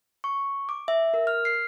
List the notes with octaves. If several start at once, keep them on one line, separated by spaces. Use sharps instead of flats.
C#6
D6
E5
A#4
F6
C7